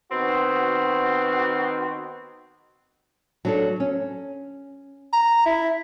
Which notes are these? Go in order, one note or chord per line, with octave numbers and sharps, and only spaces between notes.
D#3 B3 C4 F#4
F#3 D4 A4
C#4
A#5
E4